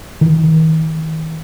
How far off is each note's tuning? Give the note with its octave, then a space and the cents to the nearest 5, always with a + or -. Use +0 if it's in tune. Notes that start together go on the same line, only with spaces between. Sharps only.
D#3 +40